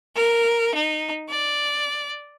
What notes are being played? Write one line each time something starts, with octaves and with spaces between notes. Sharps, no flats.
A#4
D#4
D5